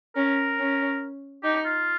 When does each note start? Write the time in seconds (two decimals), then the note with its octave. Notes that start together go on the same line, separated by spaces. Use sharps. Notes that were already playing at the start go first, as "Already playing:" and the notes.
0.16 C#4 A#4
0.59 C#4
1.44 D#4 G4
1.65 F4